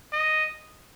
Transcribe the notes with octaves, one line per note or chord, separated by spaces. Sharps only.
D#5